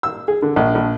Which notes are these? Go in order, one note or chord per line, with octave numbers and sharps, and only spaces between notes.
E6
G#4
D3
A#1
A#1